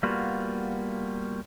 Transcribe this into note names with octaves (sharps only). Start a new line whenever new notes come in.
G3 A#3 B3 F4 F#4